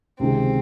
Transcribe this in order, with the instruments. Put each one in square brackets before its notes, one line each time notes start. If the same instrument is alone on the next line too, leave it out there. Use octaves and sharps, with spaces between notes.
[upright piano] C#2 C3 D#3 G#3 [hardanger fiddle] C4